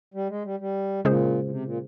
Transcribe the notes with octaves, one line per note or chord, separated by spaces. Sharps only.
G3
G#3
G3
G3
A#2 C#3 G#3 C#4 G#4 C5
A#2
C3
A#2